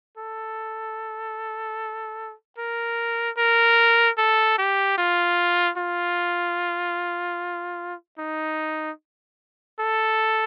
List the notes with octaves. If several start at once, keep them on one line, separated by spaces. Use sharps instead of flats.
A4
A#4
A#4
A4
G4
F4
F4
D#4
A4